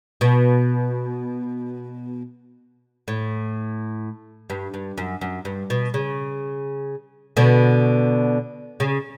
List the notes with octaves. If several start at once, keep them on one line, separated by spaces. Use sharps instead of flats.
B2
A2
G2
G2
F#2
F#2
G2
B2
C#3
B2 D3
C#3